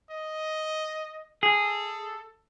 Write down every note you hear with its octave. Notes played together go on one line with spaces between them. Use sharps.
D#5
G#4 A4